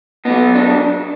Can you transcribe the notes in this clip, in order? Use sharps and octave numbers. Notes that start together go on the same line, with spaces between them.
B2 F#3 B3
D4